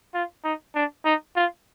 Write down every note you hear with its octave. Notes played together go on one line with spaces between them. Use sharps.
F4
D#4
D4
D#4
F4